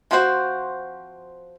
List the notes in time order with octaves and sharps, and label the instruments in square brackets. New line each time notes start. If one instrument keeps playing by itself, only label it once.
[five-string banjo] F3 C4 D4 F#4 C5